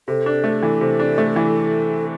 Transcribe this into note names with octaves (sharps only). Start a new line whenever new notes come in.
C3 A4
D4
A3
E3
C3
D4
A3
E3